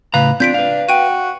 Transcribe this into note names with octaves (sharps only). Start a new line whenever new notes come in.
A2 C#3 B4 F5 A#5
C4 D4 F4 G6 B6 D7
B4 F5
F#4 G5 D#7